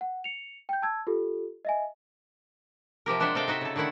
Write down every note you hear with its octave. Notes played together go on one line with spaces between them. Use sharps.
F#5
C#7 F7
G5 G6
A5 E6 G#6
F4 G4 A4
D#5 E5 G#5
C3 F3 G4 A#4
G#3 D4 C5 E5 F#5
C3 A4 D#5 F5 G5
D#4 F#4 D#5 E5
C#3 A4
D3 D#3 A3 E4 F#5